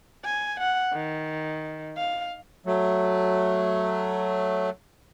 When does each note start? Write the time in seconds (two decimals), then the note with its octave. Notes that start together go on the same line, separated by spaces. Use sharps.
0.25 G#5
0.60 F#5
0.93 D#3
1.97 F5
2.66 F#3 A3